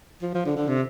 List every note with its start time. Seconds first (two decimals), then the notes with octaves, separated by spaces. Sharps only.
0.22 F3
0.34 F3
0.46 D3
0.56 D3
0.68 C3